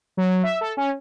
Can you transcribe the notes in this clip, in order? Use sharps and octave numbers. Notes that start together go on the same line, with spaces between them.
F#3
E5
A4
C#4